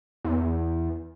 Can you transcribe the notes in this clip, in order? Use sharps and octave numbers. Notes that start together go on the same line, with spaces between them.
E2